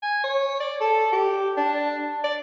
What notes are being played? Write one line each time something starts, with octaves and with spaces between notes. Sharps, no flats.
G#5
C#5
D5
A4
G4
D4
D5